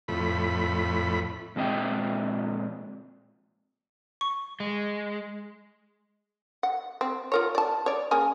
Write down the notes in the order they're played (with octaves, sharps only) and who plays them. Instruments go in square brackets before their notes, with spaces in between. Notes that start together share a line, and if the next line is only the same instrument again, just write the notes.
[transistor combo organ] F2 A2 B5
[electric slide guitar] A#2 G#3 C4 D#5 E5 G5
[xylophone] C#6
[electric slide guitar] G#3
[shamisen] F#5
C4
F4 A#4 C#5
D5 A5
C#5 D5
C#3 A#3 G#5